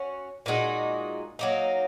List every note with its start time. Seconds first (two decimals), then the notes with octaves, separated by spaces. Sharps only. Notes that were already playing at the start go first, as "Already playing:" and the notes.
Already playing: C#4 F#4
0.46 A#2 G#3 D#4 F#4
1.39 F#3 A#3 D#4